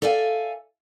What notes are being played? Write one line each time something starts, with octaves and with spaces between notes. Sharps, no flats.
A4 D5 E5 F5 G#5